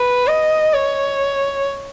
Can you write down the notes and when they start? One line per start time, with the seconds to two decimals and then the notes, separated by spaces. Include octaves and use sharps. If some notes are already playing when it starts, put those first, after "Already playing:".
Already playing: B4
0.27 D#5
0.73 C#5